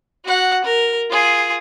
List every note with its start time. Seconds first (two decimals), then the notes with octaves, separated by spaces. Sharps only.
0.25 F#4 F#5
0.64 A#4
1.10 F4 G#4